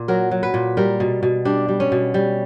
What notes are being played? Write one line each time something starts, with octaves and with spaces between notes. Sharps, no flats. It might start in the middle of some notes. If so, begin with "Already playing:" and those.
Already playing: A#2
F#3 A#4
F#3
B4
A#2
G3 A#4
B2
B2
G3 D4
G3
C#4
B2
G3